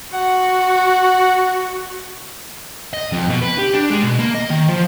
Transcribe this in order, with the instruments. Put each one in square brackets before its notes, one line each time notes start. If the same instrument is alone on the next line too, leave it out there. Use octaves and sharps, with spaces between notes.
[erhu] F#4 [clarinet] F#5
[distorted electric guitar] D#5
F2
B2
B4
G4
D4
G#3
B2
A#3
D#5
D#3
F3